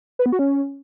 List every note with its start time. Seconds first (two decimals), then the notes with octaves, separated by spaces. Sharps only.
0.19 B4
0.26 B3
0.32 F#4
0.39 C#4